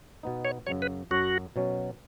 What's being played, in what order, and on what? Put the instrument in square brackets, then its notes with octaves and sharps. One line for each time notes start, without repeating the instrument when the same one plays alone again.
[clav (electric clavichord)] B2 B3 D#4
[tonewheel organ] C#5
[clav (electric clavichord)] F#2 C#3 F#3 [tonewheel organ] C#5
[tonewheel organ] B4
[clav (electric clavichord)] F#2 F#3 C#4 [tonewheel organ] F#4
[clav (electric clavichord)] B2 F#3 C#4